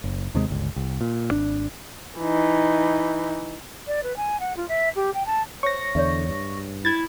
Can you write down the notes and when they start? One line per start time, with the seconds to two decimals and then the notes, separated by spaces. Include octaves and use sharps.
0.04 F#1
0.35 D#2 C3 G#3
0.48 G1 C#2
0.76 C2
1.01 A#2
1.31 G#1 D4
2.19 E3 D#4
3.87 D5
4.03 B4
4.16 G#5
4.40 F#5
4.56 F4
4.68 E5
4.95 G4
5.14 G5
5.26 A5
5.63 C5 C#5 C#6 A#6
5.95 E2 D3 C#5 D5 E5
6.29 G2
6.85 E4 G#6 A6